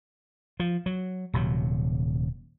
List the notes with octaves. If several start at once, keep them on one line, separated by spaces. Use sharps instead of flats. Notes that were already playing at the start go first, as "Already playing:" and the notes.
F3
F#3
D#1 C3 F#3